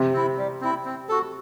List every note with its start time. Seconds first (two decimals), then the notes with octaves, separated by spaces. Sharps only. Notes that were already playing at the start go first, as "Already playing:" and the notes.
Already playing: C3
0.13 C4 E4
0.37 G3
0.61 C4 E4
0.85 C4
1.09 F#4 A4